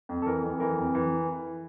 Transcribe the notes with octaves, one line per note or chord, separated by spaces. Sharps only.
F2
A4
E3 A#4
F2
E3 A#4
F2
E3